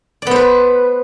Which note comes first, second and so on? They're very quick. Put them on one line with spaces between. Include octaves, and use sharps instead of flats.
D5 B3 C5 B4